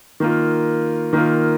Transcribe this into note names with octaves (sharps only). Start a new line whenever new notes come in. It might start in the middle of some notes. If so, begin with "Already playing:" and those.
D#3 A#3 F4
D#3 A#3 F4